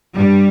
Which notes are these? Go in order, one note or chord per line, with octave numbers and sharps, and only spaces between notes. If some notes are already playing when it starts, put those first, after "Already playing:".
G2 G3